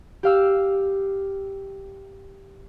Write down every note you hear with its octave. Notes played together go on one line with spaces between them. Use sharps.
G4 F5 E6